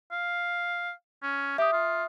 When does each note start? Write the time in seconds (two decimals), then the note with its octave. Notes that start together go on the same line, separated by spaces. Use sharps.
0.11 F5
1.23 C#4
1.58 G4 E5 D#6
1.73 F4